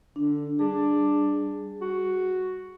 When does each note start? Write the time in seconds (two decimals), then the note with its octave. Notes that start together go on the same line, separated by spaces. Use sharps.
0.16 D3 D4
0.59 G3 D4 G#4
1.81 F#4